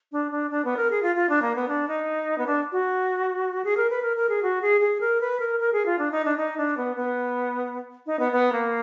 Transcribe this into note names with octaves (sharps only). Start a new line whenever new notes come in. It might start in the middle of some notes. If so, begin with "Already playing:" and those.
D4
D4
D4
B3
A#4
G#4
F4
F4
D4
A#3
B3
D4
D#4
B3
D4
F#4
G#4
A#4
B4
A#4
A#4
G#4
F#4
G#4
G#4
A#4
B4
A#4
A#4
G#4
F4
D4
D#4
D4
D#4
D4
B3
B3
D#4
B3
B3
A#3